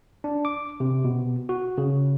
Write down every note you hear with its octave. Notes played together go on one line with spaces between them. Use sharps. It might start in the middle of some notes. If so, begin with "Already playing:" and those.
D4
D6
C3
B2
F#4
C#3